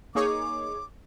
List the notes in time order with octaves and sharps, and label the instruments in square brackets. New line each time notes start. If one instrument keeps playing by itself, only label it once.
[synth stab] A#3 D#4 G#4 C#5 [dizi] D6